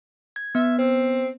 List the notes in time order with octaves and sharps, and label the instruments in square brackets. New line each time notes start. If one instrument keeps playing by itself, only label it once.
[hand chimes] G#6
[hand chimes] B3 [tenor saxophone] E5
[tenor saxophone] C4